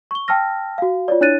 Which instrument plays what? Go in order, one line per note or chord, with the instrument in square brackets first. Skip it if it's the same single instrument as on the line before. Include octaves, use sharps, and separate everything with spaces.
[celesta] C#6 G7
G5 A5 E6 F6 A#6
F#4 F5
F4 C#5 D5
D4 E4 C#5 F#6 A6 D#7